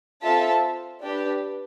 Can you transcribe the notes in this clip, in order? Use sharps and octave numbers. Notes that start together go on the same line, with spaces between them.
C4 F4 A4 E5 A5
D4 G4 B4